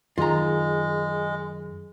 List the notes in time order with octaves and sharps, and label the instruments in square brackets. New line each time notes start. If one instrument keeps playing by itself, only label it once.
[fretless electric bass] F#2 D#3 [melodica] G#3 [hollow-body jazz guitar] F4 A#5 [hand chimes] G#4